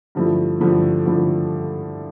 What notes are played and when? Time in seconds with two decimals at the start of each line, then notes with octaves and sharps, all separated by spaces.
0.15 G2 D3 F3 A3 E4
0.59 G2 D3 F3 A3 E4
1.06 D3 F3 A3 E4